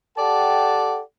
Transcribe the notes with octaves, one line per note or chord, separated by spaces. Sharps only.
G4 A4 D5 F#5 G5 A5